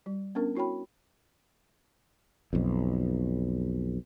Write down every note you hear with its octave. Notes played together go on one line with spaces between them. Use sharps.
G3
B3 C#4 D4 A#4
E4 F#4 C#5 G5 B5
B1 F2